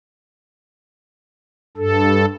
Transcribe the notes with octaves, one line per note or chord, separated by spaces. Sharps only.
G2 A4